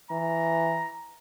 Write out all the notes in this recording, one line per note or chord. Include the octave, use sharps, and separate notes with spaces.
E3 A#5